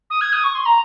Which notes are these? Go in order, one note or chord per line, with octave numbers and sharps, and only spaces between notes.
D#6
G#6
D#6
C#6
C6
A#5